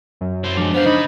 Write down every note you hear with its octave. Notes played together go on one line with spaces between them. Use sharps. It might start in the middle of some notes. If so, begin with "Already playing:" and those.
F#2
E4 C5
F3 G#3 D4
B3 C5 F5
C#3 D#4 B5